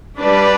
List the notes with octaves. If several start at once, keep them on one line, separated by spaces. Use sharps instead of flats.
G3 D4 B4 D5